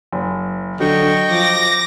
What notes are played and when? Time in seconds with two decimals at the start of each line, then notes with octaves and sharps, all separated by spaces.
0.12 F#1
0.80 D3 F#3 D#5 G5 C#6
1.30 F3 D6 A#6